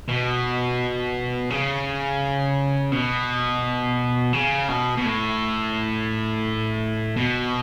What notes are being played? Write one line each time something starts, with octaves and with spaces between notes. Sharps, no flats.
B2
C#3
B2
C#3
B2
B2
A2
B2